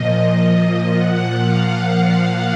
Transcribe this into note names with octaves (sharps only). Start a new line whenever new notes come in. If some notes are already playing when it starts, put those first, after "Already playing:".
Already playing: A#2 F3 D#5
A#2 F3 F#5
F5
F#5
F5